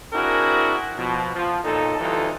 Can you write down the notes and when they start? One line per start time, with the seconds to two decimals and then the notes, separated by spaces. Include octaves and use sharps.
0.13 C4 D4 E4 F#4 G#4 A#4
0.97 B2 F3
1.34 F3
1.64 B1 A#2 D#4 A4
1.99 D2 E3 G3 D#4 F4 A4